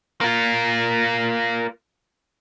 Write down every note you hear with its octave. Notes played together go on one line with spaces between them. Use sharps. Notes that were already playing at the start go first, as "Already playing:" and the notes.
A#3 F4